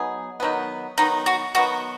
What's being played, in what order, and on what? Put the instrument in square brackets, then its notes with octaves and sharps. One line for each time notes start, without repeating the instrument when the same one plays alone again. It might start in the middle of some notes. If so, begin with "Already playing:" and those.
Already playing: [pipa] F#3 B3 D#4 G#4
D#3 F#3 B3
[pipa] D#3 F#3 B3 [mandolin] D#4
[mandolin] F#4
[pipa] D#3 F#3 B3 [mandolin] F#4